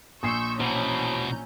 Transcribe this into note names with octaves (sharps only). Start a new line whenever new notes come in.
A#1 G#5 C6 C#6 D#6 E6 G6 C7
B2 E3 C#4 C5 A#5 B5 G6